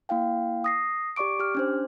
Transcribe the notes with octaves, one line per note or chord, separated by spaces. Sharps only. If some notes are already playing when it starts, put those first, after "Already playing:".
A#3 E4 F5 G5
D#6 A#6 C7
G4 D5 C#6 D6 D7
G4 F6
C#4 D4 C5